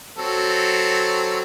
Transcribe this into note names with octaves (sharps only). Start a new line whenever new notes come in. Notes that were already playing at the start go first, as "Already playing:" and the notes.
F#3 C4 A4